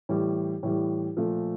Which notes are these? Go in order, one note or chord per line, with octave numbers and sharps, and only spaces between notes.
A2 E3 G3
A2 E3 G3
A#2 F3 A3